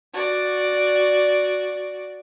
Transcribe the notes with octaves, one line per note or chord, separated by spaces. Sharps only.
F#4 D5